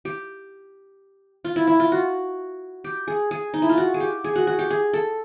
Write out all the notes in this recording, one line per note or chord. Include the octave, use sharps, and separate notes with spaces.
G4
F4
E4
E4
F4
F#4
G4
G#4
G#4
D#4
E4
F4
F#4
G#4
G4
G#4
F#4
F#4
G4
G#4
A4